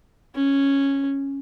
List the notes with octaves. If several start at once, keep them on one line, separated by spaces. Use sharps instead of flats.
C#4